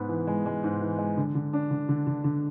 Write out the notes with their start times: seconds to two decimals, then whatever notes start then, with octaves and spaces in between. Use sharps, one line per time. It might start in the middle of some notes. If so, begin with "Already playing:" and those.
Already playing: G#2 B3
0.09 E3
0.27 G#3
0.46 G#3
0.64 G#2
0.81 E3
0.99 G#3
1.17 D3
1.35 D3
1.53 D4
1.71 D3
1.89 D3
2.07 D3
2.24 D3